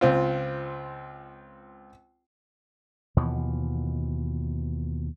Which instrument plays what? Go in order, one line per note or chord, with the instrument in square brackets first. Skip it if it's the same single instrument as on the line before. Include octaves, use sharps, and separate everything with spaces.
[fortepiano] C#2 C4 F4
[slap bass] D#2 B2 E3 F3